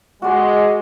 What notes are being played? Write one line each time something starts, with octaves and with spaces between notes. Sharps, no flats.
G#3 F#4 D5 C6